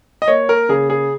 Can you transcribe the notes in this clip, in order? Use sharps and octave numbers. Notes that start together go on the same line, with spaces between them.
D#5
A#3 C#5
A#4
C#3 G#4
G#4